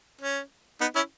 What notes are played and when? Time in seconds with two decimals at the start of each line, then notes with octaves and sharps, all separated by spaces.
0.21 C#4
0.81 B3 D#4
0.96 C#4 E4